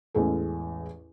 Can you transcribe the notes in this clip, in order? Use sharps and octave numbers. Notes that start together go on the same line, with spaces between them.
A1 E2 G#3 A4